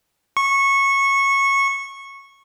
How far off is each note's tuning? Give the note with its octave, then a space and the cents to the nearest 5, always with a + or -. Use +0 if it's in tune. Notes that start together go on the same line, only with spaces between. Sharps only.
C#6 -15